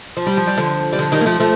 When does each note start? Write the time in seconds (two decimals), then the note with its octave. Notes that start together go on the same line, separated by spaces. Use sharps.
0.17 F3
0.27 G3
0.37 F3
0.47 G3
0.57 D3 F3
0.93 G3
0.99 D3 F3
1.12 D#3 G3
1.21 A#3
1.26 F3 A3
1.40 F3 A3